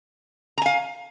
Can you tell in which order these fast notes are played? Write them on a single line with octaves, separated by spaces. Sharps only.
A#5 G#5 F5